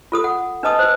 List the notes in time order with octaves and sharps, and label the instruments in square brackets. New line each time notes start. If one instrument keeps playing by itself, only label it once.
[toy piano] F4 A4 D#6
F#5
D4 B4 D#5 A5 D#6
B4 C5